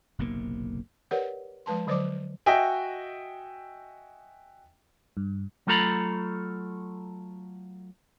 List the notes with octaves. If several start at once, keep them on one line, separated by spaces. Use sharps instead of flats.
F#1 B1 C3 A#3
G4 A#4 B4 C#5 D5 F#5
F3 G#3 B4 A5 C6
D3 F#3 C5 D5 D6
F#4 D#5 E5 G5 G#5
G2
F#3 A3 F4 A4 A#5 B5